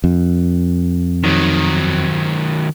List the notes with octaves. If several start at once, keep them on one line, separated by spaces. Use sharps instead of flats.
F2
D#3 F#3